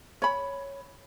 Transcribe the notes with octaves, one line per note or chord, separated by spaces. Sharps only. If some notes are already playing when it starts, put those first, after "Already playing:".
C#5 B5